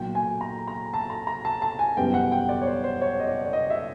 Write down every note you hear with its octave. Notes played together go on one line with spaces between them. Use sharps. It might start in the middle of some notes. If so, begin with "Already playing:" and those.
Already playing: B1 A#2 F#3 G5
G#5
A#5
A#5
A5
A#5
A#5
A5
A5
G#5
F#1 E2 B2 G3 G5
F#5
G5
D5
C#5
C5
C5
C#5
D#5
D5
D5
D#5
E5